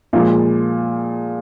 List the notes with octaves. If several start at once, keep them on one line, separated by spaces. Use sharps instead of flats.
A#2 F3 G#3